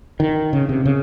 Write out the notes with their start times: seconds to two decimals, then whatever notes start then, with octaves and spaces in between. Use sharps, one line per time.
0.20 D#3
0.53 C#3
0.69 C3
0.85 C#3